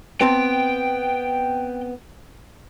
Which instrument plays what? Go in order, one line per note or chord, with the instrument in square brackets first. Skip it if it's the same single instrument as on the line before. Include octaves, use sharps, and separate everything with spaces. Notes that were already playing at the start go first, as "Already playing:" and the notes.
[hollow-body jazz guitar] B3 C4 A5 [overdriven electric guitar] G5